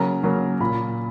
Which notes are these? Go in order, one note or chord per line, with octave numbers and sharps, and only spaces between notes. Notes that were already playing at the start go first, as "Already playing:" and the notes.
Already playing: C#3 F#3 A#3 A#4 A#5
C#3 F#3 A#3
A#2 B5